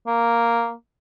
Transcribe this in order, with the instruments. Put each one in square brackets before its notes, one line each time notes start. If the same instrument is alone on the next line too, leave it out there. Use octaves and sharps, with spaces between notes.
[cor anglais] A#3